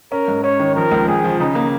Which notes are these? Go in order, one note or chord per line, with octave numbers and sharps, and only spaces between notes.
C#4 A#4
G#2
C#4 C#5
D#3
F3 A#4
C#2
C#2 G#4
F3
C#3 D#4
A#3